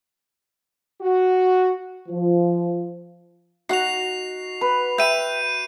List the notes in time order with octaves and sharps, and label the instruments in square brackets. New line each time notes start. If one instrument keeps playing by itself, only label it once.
[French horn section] F#4
[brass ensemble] F3
[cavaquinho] D#4 F#5 [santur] F#4 [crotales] C7 F7
[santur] B4
[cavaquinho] E5 G5 B5 [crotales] G6 D#7